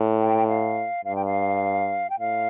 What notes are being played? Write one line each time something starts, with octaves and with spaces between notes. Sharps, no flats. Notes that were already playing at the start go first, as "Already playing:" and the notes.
Already playing: A2
G5
F5
G2 F5
G5
F5
G5
A2 F5